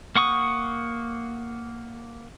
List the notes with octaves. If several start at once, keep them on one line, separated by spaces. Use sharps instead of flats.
A#3 F#5 C#6 D#6